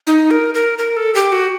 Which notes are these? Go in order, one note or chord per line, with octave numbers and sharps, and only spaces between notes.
D#4
A#4
A#4
A#4
A4
G4
F#4